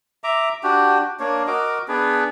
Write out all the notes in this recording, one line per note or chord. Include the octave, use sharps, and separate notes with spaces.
E5 A#5 D6
D4 F#4 G4
A#3 D4 C#5
F#4 A#4 D#5 D6
B3 D4 G#4 B4